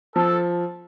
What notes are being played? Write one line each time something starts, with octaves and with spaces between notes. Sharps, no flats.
F3 A4